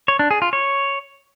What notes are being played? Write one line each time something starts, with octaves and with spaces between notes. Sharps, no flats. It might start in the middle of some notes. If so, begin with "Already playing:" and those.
C#5
D4
G#4
F4
C#5